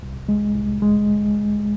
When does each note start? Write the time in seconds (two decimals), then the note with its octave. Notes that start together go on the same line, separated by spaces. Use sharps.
0.03 C2
0.29 G#3
0.55 C2
0.82 G#3